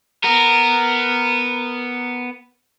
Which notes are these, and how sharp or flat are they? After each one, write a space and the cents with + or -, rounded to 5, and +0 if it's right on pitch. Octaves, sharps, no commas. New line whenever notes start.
B3 +0 A#4 -10